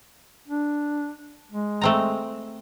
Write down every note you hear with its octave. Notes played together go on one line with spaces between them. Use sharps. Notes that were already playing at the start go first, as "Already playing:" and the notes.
D4
G#3
A3 C4 A#5